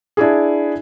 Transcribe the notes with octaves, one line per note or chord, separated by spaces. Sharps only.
D4 E4 G#4